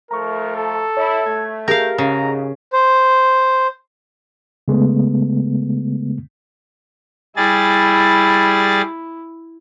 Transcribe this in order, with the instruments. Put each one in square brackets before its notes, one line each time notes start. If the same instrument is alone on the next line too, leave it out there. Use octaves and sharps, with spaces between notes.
[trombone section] F3 A3 [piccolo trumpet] A#4 [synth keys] A#5 C#6
[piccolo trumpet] A4
[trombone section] E4 [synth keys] C#5
[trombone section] A3 [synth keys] G#6
[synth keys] G4 G#4 [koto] A#4 F5 [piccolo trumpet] G6
[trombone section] G#2 [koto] C#3 [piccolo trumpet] A#5
[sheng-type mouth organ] C5
[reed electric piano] C#3 G#3 A3 B3
[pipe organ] G3 G#4 A6 [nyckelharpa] E4